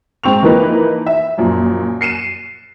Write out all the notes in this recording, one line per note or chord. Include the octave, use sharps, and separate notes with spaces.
G#2 C4 C#6 F7
E3 F3 A#3 D#4 B4
E5
F#2 A#2 F3
C7 C#7 D#7 E7